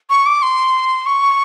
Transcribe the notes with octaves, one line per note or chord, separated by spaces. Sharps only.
C#6
D6
C6
C#6